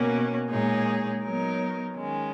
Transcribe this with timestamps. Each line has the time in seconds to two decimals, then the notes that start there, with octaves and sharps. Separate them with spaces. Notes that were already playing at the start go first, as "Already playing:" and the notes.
Already playing: B2 A#3 C#4 F#4
0.50 A#2 G#3 D#4 G#4 C#5
1.22 F#3 B3 D#4 A#4 C#5
1.95 D#3 G#3 C#4